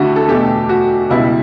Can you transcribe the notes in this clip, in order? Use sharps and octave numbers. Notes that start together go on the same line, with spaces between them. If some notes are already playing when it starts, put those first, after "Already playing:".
Already playing: D2 D3 A3 E4 F#4 G4
A4
E2 B2 A3 G4
F#4
C#2 B2 G3 E4